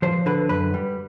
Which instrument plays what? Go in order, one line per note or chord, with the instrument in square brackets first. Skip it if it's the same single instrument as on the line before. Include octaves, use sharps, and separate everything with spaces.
[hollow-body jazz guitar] F3 C5
D3 B4
F#2 B4
G3